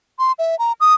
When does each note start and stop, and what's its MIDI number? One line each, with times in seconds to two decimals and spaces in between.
0.19 0.32 84
0.39 0.58 76
0.59 0.72 82
0.80 0.95 87